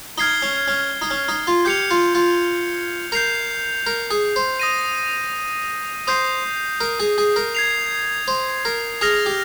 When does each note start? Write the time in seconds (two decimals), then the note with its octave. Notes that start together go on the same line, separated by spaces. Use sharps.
0.18 D#4 F6 G#6 C7 G7
0.42 C#4
0.68 C#4
1.02 D#4
1.10 C#4
1.28 D#4
1.47 F4
1.65 G4 G6 C#7 F7
1.91 F4
2.15 F4
3.12 A#4 G6 C7 F7
3.86 A#4
4.11 G#4
4.36 C5
4.60 D#6 A#6 D#7
6.07 C5 D#6 G6 C7
6.80 A#4
7.00 G#4
7.18 G#4
7.36 A#4
7.55 G#6 C7 F7
8.28 C5
8.65 A#4
9.01 G#4 F6 A#6 F7
9.26 G4